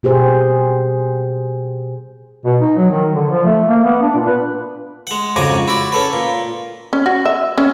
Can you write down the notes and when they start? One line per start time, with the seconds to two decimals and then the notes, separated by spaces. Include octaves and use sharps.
0.03 B2 G4 G#4 C5
2.45 B2
2.60 D#4
2.77 F#3
2.91 D#3
3.15 D3
3.30 F3
3.45 A3
3.67 A#3
3.84 B3
4.02 D4
4.15 A#2
4.27 B4
5.07 G#3 F#5
5.36 F2 G#2 C#3 F#4 G#5 D6
5.68 E4 F#4 D5
5.92 C#4 A4 B4
6.13 A#2
6.93 C#4
7.06 F#4
7.25 E5
7.58 C#4